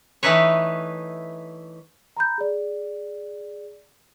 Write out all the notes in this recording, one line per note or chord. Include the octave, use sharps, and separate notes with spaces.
E3 A3 D#4 B4 C#5
A#5 B5 G6
G#4 D5